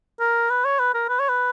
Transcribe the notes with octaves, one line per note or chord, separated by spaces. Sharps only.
A#4
B4
C#5
B4
A#4
B4
C#5
B4